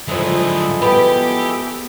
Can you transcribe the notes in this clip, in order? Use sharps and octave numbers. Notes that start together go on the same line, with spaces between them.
D3 F3 F#3 G#3 E4 G#4 A4
B3 G4 G5